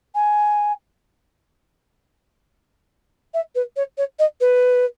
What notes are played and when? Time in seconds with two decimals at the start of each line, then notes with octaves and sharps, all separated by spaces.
0.15 G#5
3.34 E5
3.55 B4
3.76 C#5
3.98 C#5
4.19 D#5
4.40 B4